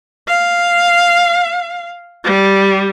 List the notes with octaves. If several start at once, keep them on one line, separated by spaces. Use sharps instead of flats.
F5
G3